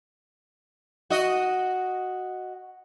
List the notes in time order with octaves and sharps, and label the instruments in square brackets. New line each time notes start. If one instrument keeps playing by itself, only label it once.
[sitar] F#4 D#5